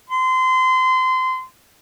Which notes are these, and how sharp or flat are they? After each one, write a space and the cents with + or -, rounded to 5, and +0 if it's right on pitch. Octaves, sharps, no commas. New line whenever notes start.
C6 -25